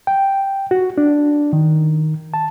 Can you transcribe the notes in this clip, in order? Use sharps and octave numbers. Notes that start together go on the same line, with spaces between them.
G5
F#4
D4
D#3
A5